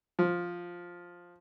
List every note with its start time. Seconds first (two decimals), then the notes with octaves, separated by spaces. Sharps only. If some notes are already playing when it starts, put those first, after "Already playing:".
0.19 F3